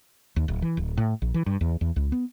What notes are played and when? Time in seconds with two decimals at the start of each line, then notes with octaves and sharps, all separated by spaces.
0.36 D#2
0.48 D1
0.62 E3
0.77 D1
0.97 A2
1.22 A#1
1.34 E3
1.46 G2
1.61 E2
1.81 E2
1.96 C#2
2.12 B3